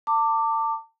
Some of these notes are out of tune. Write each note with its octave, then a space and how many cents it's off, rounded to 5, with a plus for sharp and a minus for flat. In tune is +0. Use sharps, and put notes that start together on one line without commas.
A5 +35 D6 +0